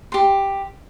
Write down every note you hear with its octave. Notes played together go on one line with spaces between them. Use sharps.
G4 C6